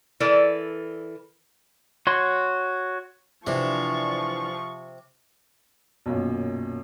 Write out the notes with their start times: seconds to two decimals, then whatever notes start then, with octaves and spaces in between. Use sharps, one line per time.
0.20 E3 A4 A#4 D5
2.07 F#4 C#5 C6
3.47 C3 E3 F3 D4 C#6
6.06 B1 F#2 A#2